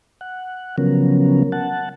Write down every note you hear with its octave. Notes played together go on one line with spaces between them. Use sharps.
F#5
C#3 F3 F#3 B3 C#4 A#4
F#5 A5